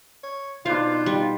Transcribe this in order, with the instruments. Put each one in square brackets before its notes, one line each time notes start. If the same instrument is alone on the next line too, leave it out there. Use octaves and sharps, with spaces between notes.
[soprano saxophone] C#5
[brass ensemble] B2 D#4 [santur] D4 B4 C5 [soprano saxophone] F4 [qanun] F5
[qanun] G3